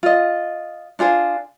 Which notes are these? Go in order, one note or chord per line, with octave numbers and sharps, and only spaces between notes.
F4 D#5
D4 F4 G#4 C5